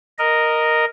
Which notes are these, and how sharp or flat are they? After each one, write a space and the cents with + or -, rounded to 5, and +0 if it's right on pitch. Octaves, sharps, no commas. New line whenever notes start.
A#4 +0 D#5 -5